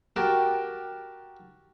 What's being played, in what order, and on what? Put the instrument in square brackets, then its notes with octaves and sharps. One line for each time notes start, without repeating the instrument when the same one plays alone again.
[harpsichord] F#4 G4 A#4 G5 A5 A#5